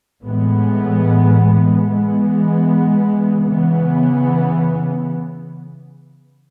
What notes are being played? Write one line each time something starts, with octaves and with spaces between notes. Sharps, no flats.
A2 E3 G#3 B3
E3 G#3 B3
C#3 E3 B3